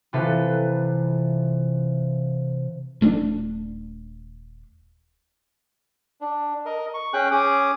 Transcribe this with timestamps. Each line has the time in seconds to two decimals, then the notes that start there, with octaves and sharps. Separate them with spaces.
0.13 C3 E3 F4 A4 B4
3.01 D#1 A3 C#4 D4
6.21 D4
6.65 A#4 D#5
6.94 C#6
7.13 C#4 G#4 G5 F#6
7.32 C#4 G#4 D6 D#6